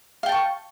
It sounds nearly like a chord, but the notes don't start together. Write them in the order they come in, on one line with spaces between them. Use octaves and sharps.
F5 G5 A5 C#6